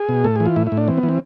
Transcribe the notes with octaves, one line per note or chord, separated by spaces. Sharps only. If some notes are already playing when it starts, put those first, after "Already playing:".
Already playing: G#4
B2
A2 A4
E3 G#4
F4
A2 E4
E4
A2
D4
E3 C4
B3
E3
C4